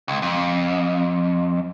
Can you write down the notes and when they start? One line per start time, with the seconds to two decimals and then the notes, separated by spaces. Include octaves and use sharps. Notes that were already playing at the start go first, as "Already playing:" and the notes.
0.08 C#2
0.22 F2